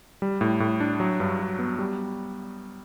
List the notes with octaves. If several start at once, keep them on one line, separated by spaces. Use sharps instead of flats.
G3
A2
A2
D4
F#3
G2
F#4
B3
G3